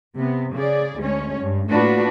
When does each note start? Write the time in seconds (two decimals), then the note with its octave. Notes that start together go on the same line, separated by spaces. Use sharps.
0.17 C3 B3
0.55 C#3 G#4 D5
0.97 D2 G#3 C#4 C#5
1.41 G2
1.70 A2 A#3 D4 F4 F#4 B4